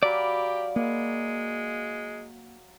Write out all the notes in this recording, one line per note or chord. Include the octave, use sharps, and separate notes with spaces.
F#3 G4 D5 F5 B5
G#3 A#3